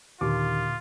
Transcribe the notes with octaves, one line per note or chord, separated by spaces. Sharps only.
D#2 A#2 D3 F4 D6